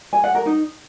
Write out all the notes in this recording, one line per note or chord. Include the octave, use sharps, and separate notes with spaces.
G#5
F#5
A#4
D#4